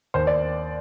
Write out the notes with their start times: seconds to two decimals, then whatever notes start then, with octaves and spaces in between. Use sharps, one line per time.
0.14 D#2 C5
0.27 D5